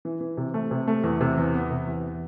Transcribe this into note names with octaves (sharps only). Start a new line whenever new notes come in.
E3
E3
C3
A3
C3
A3
E2
C3
E2
B3
C3
E2